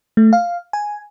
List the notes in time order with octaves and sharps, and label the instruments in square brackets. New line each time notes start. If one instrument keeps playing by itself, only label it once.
[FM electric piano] A3
F5
G#5